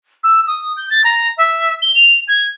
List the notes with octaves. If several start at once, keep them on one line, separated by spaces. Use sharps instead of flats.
E6
D#6
G6
A6
A#5
E5
G7
F7
G#6